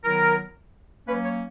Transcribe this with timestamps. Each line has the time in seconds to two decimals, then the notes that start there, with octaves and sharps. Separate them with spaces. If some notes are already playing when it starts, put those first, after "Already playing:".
0.04 D#3 F#3 B3 E4 A#4
1.07 F#3 A#3 C#4 B4
1.25 C#5